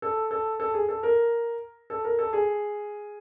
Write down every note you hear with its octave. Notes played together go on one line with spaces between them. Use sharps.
A4
A4
A4
G#4
A4
A#4
A4
A#4
A4
G#4